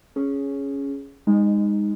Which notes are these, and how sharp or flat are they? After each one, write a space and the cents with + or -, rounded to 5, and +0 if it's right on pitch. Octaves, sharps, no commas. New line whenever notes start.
C#4 +0 G#4 +5
G#3 -25 D#4 +0